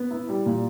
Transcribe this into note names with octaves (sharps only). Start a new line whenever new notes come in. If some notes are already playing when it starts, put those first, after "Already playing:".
Already playing: B3
E4
G3
A#2